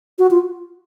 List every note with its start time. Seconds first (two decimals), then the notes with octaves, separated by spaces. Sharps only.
0.19 F#4
0.31 F4